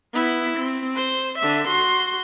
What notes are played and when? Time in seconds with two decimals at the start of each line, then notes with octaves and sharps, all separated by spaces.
0.13 B3 E4
0.57 C4
0.95 C5
1.39 D3 E5
1.68 F#4 C6